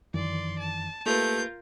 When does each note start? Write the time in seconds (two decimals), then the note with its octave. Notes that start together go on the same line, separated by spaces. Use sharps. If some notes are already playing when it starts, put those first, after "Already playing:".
0.14 F#2 D#3 E3 D5 C6
0.59 A5
1.06 A3 A#3 F4 G4 A#4 B4 G6